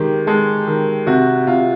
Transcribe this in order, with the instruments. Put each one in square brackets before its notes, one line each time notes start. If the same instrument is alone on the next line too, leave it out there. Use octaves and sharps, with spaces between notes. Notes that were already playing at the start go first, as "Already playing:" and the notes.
Already playing: [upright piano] D#3 G#3 G4
G#3 A4
D#3
C3 F#4
C3 F4